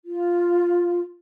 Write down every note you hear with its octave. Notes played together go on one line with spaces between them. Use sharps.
F4